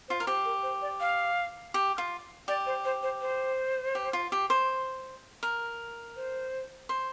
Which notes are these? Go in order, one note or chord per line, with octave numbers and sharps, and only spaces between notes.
F4 C5
A#4
G4 C5
A#4
C5
D5
F5
G4
F4
G4 D5
C5
C5
C5
C5
G4
F4
G4
C5
A#4
C5
C5